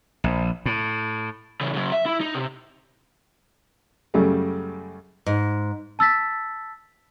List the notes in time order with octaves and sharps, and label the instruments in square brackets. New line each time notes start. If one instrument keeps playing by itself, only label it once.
[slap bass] A#1
A2
[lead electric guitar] C#3 E3
C#3 F#3
E5
E4
D#4
C3
[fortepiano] F#2 C#3 G3 A3
[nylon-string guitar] G#2
[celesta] A5 E6 A6 B6